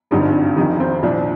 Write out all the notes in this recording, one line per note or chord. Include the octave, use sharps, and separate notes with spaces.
G#1 G2 D3 F3 D#4 G4
F1 F2 D#3 D#4 G4
C4
C2 A#2 F3 D4